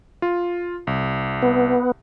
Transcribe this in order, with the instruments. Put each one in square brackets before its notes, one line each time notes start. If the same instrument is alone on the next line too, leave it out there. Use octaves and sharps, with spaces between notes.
[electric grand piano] F4
C2
[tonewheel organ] B3